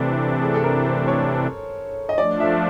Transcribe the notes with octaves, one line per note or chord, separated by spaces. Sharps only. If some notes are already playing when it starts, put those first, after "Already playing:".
Already playing: C3 E3 A3 D4
G#4
A4
A#4
C5
C#5
D#5
F3 A3 D4 D5
E5